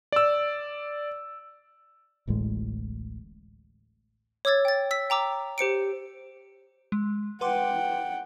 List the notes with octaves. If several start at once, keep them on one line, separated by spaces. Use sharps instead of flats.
D5 E6
D1 A1 A2 G#3
C#5 D6 E6 G#6 A6
G5 A6
E6 B6
G5 A#5 D6 E6
G4 C5 C#7 D7
G#3
B4 F#5 G5 C6 D6